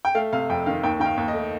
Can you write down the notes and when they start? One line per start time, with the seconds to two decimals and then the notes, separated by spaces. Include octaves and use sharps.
0.05 G5
0.15 A3 F5
0.33 C3 F5
0.50 F2 G5
0.66 D#3 F5
0.83 D#2 G5
1.00 D#3 G5
1.05 F5
1.17 D#2
1.28 D#5
1.34 A3